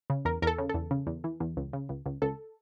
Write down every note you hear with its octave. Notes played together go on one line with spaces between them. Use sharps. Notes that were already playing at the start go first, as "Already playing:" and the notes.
C#3
E2 A#4
E2 A4 A#4
C#3
E2 A4
C#3
E2
E3
E2
C#2
C#3
C#2
C#2
C#2 A4